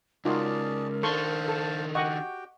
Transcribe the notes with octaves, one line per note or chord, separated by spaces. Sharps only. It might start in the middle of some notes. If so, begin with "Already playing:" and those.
C#2 D#4 F4 F#4 G#4 A#4 D5 A5
D#3 D4 A4 C5 F5 A5 C6 C#6
A4
F#4 G4 D#5 F#5 G5 C#6